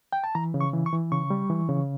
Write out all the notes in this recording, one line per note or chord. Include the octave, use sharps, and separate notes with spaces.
G5
A5
E3 A#5
C#3
C#6
E3
C#6
E3
C#3 C#6
G3
E3
C#3